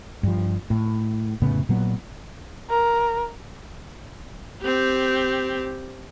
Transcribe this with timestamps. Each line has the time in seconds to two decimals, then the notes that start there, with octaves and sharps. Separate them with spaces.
0.23 G2 F3
0.70 A2
1.42 F1 A2 C#3 B3
1.69 A#2 F#3 B3
2.70 A#4
4.62 C4 G4